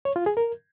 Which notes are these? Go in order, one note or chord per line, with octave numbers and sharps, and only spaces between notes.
C#5
F4
G#4
A#4